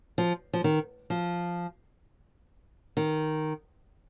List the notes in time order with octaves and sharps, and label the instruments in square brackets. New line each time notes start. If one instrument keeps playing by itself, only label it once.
[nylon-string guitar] F3
F3
D#3
F3
D#3